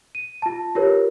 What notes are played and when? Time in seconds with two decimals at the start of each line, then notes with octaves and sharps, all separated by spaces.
0.15 D#7
0.42 F4 A5
0.75 F4 G4 A#4 B4 C#5